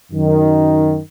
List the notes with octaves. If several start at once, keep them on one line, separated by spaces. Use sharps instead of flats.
F#2 D#3